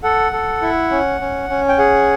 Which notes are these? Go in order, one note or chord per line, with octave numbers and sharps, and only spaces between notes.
A4 F#5
A4
E4
C#4
C#4
C#4
G5
G#4 F#5